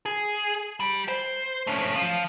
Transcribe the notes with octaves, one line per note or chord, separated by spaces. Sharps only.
G#4
G3
C5
A3 C#4
F3